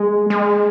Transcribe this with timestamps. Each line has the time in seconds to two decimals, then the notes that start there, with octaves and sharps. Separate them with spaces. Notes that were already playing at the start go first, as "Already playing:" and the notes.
Already playing: G#3
0.30 G#3